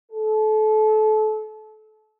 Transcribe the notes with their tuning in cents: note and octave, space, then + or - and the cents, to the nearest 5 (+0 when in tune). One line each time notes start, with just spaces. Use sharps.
A4 -30